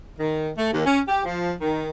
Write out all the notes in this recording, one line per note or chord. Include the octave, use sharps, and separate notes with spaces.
D#3
A3
D#2
C#4
G4
F3
D#3